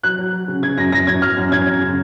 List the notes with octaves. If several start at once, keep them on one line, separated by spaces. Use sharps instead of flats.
F#3 F#6
F#3
F#3
C#3
C#3 G#6
F#2 A#6
F#2 A#6
F#2 G#6
F#3 F6
F#2
F#2 G#6
F#2
C#3